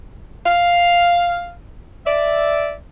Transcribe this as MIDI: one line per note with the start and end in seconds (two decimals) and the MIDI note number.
0.46 1.53 77
2.06 2.73 74
2.06 2.73 76